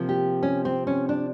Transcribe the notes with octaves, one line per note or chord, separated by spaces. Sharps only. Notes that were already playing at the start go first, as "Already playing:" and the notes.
Already playing: C3 F3 A#3
G4
C#4
C4
C#4
D4